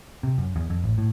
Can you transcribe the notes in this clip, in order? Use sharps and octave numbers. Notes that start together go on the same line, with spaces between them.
C3
F#2
E2
F2
A1
A2